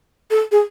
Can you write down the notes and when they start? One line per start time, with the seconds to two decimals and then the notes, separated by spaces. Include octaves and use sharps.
0.31 A4
0.52 G#4